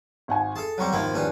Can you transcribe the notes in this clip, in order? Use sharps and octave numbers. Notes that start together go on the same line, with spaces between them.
G#1 F#5 G#5
G#4 A4 A5
F#3 G3 C4 F#5 A#5 C#6
G#1 D#2 A#2 D#3 F3 E4
A#1 G2 C#4